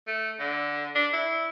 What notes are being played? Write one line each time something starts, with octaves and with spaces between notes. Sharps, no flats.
A3
D3
D4
E4